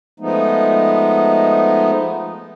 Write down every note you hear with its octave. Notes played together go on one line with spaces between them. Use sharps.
F3 G#3 A3 B3 D#4